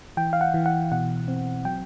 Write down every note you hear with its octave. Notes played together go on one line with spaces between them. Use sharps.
E3 G5
F5
F#5
E3
F#5
B2 F#5
C4
F#3 G5